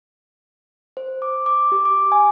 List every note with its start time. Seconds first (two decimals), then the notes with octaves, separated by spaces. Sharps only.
0.97 C5
1.22 D6
1.46 D6
1.72 G4
1.85 D6
2.12 G#5